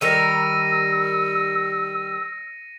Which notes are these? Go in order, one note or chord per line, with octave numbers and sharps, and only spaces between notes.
D#3 G3 A#4 E6 A#6 C#7 D#7